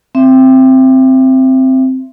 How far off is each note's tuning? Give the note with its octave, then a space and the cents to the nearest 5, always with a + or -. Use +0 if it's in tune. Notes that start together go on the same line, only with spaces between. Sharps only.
C4 +0 E5 +30